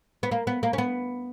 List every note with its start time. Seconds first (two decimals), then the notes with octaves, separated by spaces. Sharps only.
0.23 B3
0.31 A#3
0.47 B3
0.63 A#3
0.73 C#4
0.78 B3